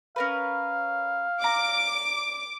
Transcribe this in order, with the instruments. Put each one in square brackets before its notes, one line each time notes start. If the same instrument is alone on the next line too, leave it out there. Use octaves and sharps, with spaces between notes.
[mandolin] C#4 A#4 B4 [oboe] F5
[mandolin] D5 A#5 [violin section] D6